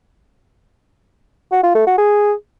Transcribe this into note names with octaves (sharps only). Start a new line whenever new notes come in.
F#4
F4
A3
F#4
G#4